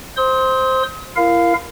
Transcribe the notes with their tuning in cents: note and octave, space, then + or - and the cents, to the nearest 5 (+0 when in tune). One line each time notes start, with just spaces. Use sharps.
C5 +0 C6 +0 D#6 +45
E4 +40 A#4 +0 F5 +0